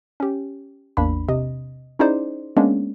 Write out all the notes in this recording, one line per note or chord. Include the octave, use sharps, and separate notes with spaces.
C#4 G4
A1 E2 A#3 D4 B5
C3 D#5
C#4 D#4 E4 G#4 C5 D5
G#3 A#3 B3 C#4 D4